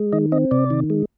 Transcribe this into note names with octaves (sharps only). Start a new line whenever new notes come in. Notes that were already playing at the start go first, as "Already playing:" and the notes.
Already playing: G#3
D#3 D#5
C4 D#5
C3 D5
D#3
G#3